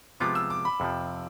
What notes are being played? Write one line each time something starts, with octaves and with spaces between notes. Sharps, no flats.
C3 F3 G#3 B3 F4 D6
E6
D6
B5
F2 C3 F3